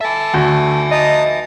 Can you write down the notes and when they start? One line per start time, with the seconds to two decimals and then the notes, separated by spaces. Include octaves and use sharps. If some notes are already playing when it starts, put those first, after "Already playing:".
0.01 A4 E5 G#5 A5
0.34 D2 A3
0.91 D#5 A5 A#5 D#6